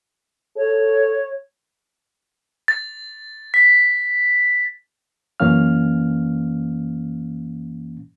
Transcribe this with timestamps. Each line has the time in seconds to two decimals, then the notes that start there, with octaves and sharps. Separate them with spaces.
0.57 A4 C#5
2.68 A6
3.54 B6
5.40 F#2 E3 A#3 C#4 F5 F6